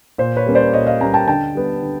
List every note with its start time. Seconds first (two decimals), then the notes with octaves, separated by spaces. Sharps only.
0.18 A#2 C5
0.37 B4 C#5
0.46 G3 A#3 C#4
0.55 C5 D5
0.73 A#2 C#5 D#5
0.87 D#5 F5
1.01 G3 A#3 C#4 G#5 A#5
1.14 G5 A5
1.27 D3 G5 A5
1.55 G3 B3
1.82 D3